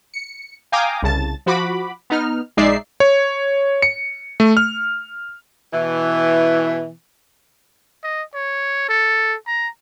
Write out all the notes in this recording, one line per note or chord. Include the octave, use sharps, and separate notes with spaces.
C#7
F5 G5 G#5 A#5 D6 D#6
C2 C#3 A5 A6
F3 F#4 B5 D6
B3 D#4 F6
A#1 G#3 D#4 D5 E5 C7
C#5
C#7
A3
F6
B2 E3
D#5
C#5
A4
A#5